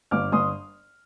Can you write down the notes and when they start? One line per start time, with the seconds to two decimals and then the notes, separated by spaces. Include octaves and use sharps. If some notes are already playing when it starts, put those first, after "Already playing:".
0.11 G1 D6 F6
0.32 G1 C6 D#6